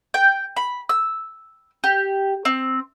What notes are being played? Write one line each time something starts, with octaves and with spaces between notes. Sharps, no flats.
G5
B5
E6
G4
C4